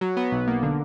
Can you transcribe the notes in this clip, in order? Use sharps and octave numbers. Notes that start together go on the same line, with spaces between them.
F#3
B3
B1
A#3
D3